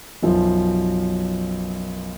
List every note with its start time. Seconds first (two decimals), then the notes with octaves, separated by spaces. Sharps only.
0.22 B1 F#2 F3